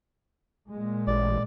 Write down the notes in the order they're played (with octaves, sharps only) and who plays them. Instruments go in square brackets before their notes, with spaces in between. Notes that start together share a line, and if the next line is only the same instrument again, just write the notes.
[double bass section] A#2 G#3
[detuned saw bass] A1 [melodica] D5